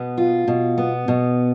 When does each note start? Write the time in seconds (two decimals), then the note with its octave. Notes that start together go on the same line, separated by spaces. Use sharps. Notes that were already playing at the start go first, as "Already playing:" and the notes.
Already playing: B2 B3
0.17 F4
0.48 B2
0.78 B3
1.08 B2